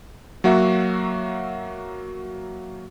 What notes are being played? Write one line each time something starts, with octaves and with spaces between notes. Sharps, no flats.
F#3 A#3 F#4 E5